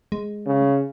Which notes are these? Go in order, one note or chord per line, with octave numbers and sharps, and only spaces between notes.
G#3
C#3